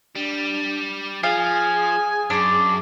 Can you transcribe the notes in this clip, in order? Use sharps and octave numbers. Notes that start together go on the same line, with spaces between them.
G3 D4
F3 G#4 F5 G#5
F#2 D4 D5